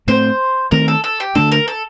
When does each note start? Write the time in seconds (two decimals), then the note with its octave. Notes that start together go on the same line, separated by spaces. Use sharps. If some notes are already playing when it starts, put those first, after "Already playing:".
0.07 A2 A3 C4 C5
0.71 D#3 A3 C4 A#4
0.88 A4
1.04 A4
1.20 G4
1.35 D3 A3 D4 A4
1.52 A#4
1.68 A4